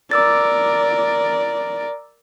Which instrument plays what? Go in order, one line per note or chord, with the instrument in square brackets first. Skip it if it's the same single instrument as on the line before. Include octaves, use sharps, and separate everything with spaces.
[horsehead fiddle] A#4 D5 [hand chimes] D6 E6 A6